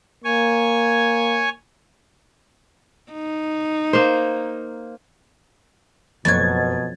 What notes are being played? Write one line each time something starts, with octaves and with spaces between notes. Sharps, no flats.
A#3 C#5 G#5
D#4
A#3 C5
F#1 F2 B2 F#3 F#4 G#6 A6